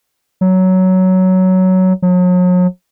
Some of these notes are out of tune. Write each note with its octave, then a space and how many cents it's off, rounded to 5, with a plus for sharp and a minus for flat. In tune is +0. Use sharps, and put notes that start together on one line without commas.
F#3 +10
F#3 -40